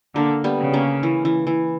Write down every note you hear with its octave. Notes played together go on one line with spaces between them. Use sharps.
D3 A#3
G3 B3
C#3
A#3 C#4
E3
E3
E3